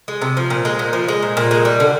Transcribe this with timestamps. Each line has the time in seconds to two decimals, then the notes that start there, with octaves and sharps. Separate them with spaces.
0.08 G#3
0.22 C3
0.37 F3
0.50 A#2
0.65 G#3
0.79 A#2
0.93 F3
1.08 G#3
1.22 A#2
1.37 A#2
1.51 G#3
1.65 G3
1.80 D3